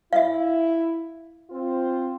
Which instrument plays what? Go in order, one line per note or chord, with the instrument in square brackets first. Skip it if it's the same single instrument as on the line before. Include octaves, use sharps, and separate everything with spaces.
[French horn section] E4 [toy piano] E5 F5
[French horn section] C4 F4 C5